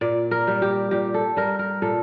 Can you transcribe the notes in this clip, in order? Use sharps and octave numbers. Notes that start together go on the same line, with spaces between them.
A#2 D5
A#4
G3
G4
A#2 G4
A4
G3 A#4
A#4
A#2 A4